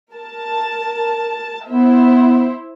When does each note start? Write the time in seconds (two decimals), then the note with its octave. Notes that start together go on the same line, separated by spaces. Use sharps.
0.13 A#4 A5
1.68 B3 E4 C5 E5